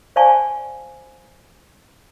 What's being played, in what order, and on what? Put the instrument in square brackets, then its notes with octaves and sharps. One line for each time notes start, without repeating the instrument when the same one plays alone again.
[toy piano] C5 D5 F5 G#5 A5 C#6